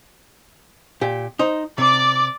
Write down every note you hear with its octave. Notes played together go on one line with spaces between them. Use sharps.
A#2 G4
D#4 C5
C3 D5 D6